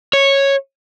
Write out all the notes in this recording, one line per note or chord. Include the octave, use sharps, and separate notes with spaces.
C#5